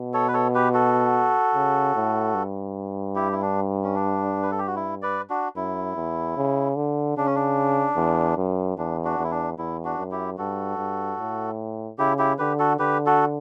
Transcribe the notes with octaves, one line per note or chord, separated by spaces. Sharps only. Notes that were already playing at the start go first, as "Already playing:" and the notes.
Already playing: B2
A4 C#5
B4
A4 C#5
G4 B4
F#4 A4
C#3
A2
G2
E4 G4
E4
D4
C#4
D4
B4
A4
G4
F#4
E4
B4 D5
D4 F#4
F#2 E4
E2
C#3
D3
C#3 D4
C#4
D4
E2
F#2
E2 D4
D4 F#4
E2
E4
D4
E2 E4
D4 F#4
F#2
E4 G4
G2 F#4 A4
G2
A2
C#3 E4 G4
E4 G4
D3 G4 B4
F#4 A4
D3 G4 B4
F#4 A4